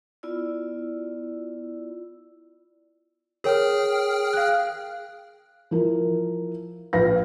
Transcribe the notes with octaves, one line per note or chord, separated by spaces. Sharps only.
B3 E4 F4 D5 E6
G#4 A#4 C#5 G5 F6
F5 F#6
F3 E4 A#4
A#1 B4 F5 A#6